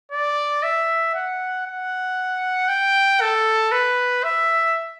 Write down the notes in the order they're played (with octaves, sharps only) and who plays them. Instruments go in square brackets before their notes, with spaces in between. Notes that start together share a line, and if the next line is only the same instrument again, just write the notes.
[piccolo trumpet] D5
E5
F#5
F#5
G5
A4
B4
E5